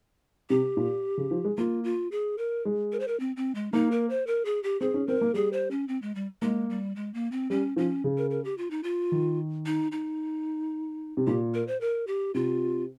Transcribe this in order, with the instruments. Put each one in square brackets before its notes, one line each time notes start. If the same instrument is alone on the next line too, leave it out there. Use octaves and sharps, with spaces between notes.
[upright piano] C3 [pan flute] G4
[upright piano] A#2
C#3
F3
G#3
[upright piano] A#3 [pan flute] F4
[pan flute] F4
G#4
A#4
[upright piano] G#3
[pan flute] A#4
C5
A#4
C4
C4
G#3
[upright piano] A#3 [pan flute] D#4
[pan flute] A#4
C5
A#4
G#4
G4
[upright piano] C4 [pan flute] G#4
[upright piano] C#4
[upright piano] C4 [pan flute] A#4
[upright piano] A#3
[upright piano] G3 [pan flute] G#4
[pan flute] C5
C#4
C4
G#3
G3
[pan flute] G#3 [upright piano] A#3
[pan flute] G3
G#3
A#3
C4
[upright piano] G3 [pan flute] C#4
[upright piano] F3 [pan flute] C#4
[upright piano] C#3
[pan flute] A#4
A#4
G4
F4
D#4
F4
[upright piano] D#3
[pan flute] D#4
D#4
[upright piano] C3
[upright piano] A#2 [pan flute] G4
[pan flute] A#4
C5
A#4
G4
[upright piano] C3 [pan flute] F4